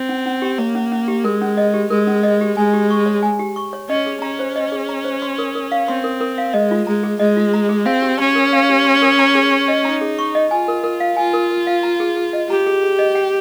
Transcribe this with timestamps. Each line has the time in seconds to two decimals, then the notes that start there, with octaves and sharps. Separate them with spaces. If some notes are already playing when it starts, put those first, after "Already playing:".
Already playing: C4
0.09 C#4
0.26 C#4
0.42 G4
0.58 A#3 C#5
0.75 C#4
0.92 C#4
1.08 G4
1.24 G#3 A#4
1.42 C#4
1.57 D#5
1.74 G4
1.90 G#3 A#4
2.07 C#4
2.23 D#5
2.41 G4
2.57 G#3 G#5
2.73 G4
2.90 C#6
3.06 C#5
3.23 G#5
3.39 G4
3.56 C#6
3.73 C#5
3.89 C#4 D#5
4.06 G#4
4.22 C#4 A#5
4.39 C5
4.56 D#5
4.72 G#4
4.89 A#5
5.04 C5
5.22 C6
5.38 A#4
5.55 A#4
5.72 F5
5.88 C4 C6
6.04 A#4
6.21 A#4
6.38 F5
6.54 G#3 D#5
6.71 F4
6.87 G#3 A#5
7.03 G#4
7.20 G#3 D#5
7.37 F4
7.54 A#5
7.69 G#4
7.86 C4 F5
8.02 G4
8.19 C#4 C6
8.35 A#4
8.53 F5
8.70 G4
8.85 C6
9.02 A#4
9.19 A#5
9.35 G#4
9.51 C#6
9.68 D#5
9.85 D#4 A#5
10.01 G#4
10.19 C#6
10.35 D#5
10.51 F4 G#5
10.68 A#4
10.84 A#4
11.00 F5
11.17 F4 G#5
11.34 A#4
11.50 A#4
11.67 F5
11.83 A#5
12.00 G#4
12.16 G#4
12.33 D#5
12.50 G4 A#5
12.67 G#4
12.83 G#4
12.99 D#5
13.15 G5